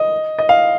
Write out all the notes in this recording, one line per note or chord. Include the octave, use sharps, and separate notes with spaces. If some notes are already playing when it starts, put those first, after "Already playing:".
Already playing: D#5
D#5
F5